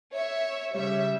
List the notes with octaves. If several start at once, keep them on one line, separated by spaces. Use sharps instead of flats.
C#5 E5
C#3 G3 C#5 E5